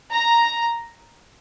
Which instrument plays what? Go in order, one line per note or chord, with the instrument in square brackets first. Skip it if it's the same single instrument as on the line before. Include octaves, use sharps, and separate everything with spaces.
[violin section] A#5